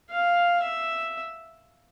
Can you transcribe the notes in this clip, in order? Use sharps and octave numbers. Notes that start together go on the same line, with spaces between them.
F5
E5